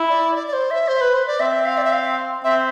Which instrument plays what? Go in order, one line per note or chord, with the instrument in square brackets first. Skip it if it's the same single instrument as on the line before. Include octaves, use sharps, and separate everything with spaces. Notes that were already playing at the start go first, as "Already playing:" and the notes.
Already playing: [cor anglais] E4
[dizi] D5
D5
D5
C5
E5
C5
B4
C5
D5
[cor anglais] C4 [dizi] E5
[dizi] F5
D5
E5
F5
[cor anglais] C4 [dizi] E5